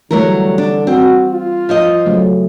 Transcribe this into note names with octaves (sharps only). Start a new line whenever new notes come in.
D3 E3 F#3 G3 A3 A#4
D4
C4 F#4
F4
F3 C5 D#5
C#3 F#3 A3